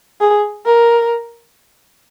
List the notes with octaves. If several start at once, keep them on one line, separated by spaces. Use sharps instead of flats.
G#4
A#4